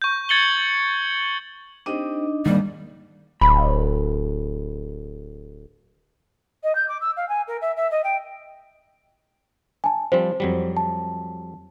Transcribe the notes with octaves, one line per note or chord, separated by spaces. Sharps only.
C#6 G6
G#6 A6 C#7 F#7 G7
C4 D4 D#4 G4 D#5 D#7
D#2 G#2 D#3 G3 A#3
D1 B5
D#5
G6
D6
E6
F5
G#5
A#4
E5
E5
D#5
G5
G#5 A5
F3 G3 C4 C5
F2 F#3 G3
A5